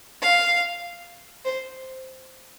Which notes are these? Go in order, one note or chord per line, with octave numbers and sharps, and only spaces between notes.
F5
C5